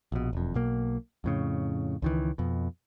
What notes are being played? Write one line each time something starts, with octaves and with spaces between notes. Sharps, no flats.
A#1 B2
E1 F2
B1 B2 A#3
F2 A2 C#3
C#2 D#3 E3
F2 B2